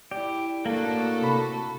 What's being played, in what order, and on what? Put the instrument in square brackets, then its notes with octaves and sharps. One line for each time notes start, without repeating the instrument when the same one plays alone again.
[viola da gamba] E4 [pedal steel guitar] G4 [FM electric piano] D5
[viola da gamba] A2 F#4 [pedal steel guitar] A#3 D4 [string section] A4
[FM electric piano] C3 B5